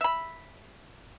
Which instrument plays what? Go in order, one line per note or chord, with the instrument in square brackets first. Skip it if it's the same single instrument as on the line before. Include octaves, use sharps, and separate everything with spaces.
[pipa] E5 B5